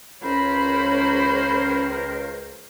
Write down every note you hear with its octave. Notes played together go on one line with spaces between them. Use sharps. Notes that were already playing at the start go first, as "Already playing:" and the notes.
C#2 C#4 A#4 C5 C#5 B5